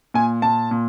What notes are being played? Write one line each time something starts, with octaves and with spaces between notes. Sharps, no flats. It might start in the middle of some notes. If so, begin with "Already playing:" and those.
A#2 G#5
A#2 A5
A#2